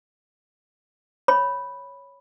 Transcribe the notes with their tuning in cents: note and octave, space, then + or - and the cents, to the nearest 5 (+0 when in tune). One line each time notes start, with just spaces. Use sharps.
C#5 +0 B5 +0